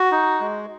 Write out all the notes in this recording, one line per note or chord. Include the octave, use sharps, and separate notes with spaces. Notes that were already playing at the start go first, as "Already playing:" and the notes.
Already playing: F#4
D#4
G#3